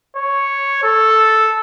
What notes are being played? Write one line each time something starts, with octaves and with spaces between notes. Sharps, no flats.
C#5
A4